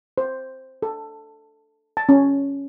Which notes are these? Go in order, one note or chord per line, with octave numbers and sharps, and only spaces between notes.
C5
A4
A5
C#4